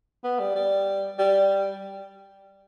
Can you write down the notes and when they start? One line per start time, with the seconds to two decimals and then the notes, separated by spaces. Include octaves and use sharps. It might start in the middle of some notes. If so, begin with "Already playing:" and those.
0.24 B3
0.40 G3
0.55 G3
1.19 G3